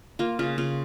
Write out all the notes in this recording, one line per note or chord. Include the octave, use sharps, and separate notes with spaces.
A#3 F4
C#3 F4
C#3 F4